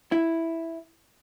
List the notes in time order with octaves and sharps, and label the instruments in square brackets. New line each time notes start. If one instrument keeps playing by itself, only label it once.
[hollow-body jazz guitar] E4